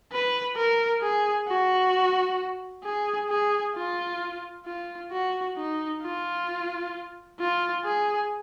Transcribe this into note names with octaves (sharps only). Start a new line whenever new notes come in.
B4
A#4
G#4
F#4
G#4
G#4
F4
F4
F#4
D#4
F4
F4
G#4